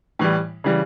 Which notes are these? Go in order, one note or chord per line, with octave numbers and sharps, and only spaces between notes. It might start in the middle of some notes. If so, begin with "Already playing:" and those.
A2 E3 G3
C#3 E3 G3